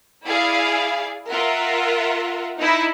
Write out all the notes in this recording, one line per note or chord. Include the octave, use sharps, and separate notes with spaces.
E4 G#4 D5 F5
F4 A#4 E5 F#5
D#4 E4